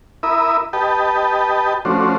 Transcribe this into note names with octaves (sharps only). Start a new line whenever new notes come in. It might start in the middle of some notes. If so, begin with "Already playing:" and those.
E4 A#4 E5 B5 D#6
G4 B4 D#5 G5 A5
F3 A3 C#4 D4 F#4 C5